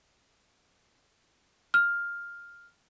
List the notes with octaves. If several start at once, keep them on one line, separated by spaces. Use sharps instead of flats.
F6